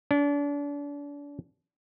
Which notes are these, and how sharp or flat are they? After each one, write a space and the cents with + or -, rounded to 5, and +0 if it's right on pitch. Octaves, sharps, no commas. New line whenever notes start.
D4 -35